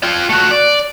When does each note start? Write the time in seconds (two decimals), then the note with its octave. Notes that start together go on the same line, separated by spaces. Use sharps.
0.03 F4 G5
0.29 A3 F#4
0.51 D5